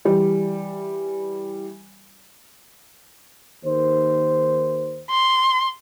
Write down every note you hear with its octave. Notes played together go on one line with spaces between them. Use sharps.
E3 G3
D#2 D#3 C5
C6